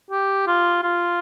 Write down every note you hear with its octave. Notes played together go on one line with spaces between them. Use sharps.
G4
F4
F4